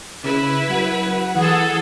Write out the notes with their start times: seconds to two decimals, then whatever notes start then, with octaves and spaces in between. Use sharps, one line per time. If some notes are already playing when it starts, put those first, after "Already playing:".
0.24 C#3 E4 B4
0.69 F#3 F#5
1.35 E3 G#4 A4